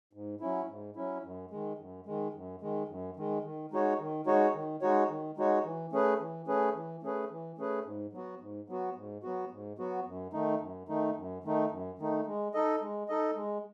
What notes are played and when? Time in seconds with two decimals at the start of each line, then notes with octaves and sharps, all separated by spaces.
0.13 G#2
0.41 F#3 C#4 E4
0.69 G#2
0.96 F#3 C#4 E4
1.23 F#2
1.51 D#3 G#3
1.78 F#2
2.06 D#3 G#3
2.34 F#2
2.61 D#3 G#3
2.89 F#2
3.16 D#3 G#3
3.44 D#3
3.71 G#3 D#4 F#4 C#5
3.99 D#3
4.26 G#3 D#4 F#4 C#5
4.54 D#3
4.82 G#3 D#4 F#4 C#5
5.09 D#3
5.37 G#3 D#4 F#4 C#5
5.64 E3
5.92 A3 C#4 G#4 B4
6.20 E3
6.47 A3 C#4 G#4 B4
6.75 E3
7.03 A3 C#4 G#4 B4
7.30 E3
7.58 A3 C#4 G#4 B4
7.85 G#2
8.13 F#3 B3 F#4
8.40 G#2
8.68 F#3 B3 F#4
8.96 G#2
9.23 F#3 B3 F#4
9.51 G#2
9.78 F#3 B3 F#4
10.06 F#2
10.33 D#3 A3 D#4
10.61 F#2
10.88 D#3 A3 D#4
11.16 F#2
11.44 D#3 A3 D#4
11.71 F#2
11.98 D#3 A3 D#4
12.26 G#3
12.54 D#4 A4 D#5
12.81 G#3
13.09 D#4 A4 D#5
13.36 G#3